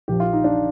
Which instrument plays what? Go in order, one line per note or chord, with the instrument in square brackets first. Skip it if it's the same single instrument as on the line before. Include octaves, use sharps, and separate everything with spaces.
[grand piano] A#1 A#2 F3 G4
F4
D#4
D4